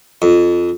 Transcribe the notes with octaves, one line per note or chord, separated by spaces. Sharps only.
F2